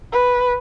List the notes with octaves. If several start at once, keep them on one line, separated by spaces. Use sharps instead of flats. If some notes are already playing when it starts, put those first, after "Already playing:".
B4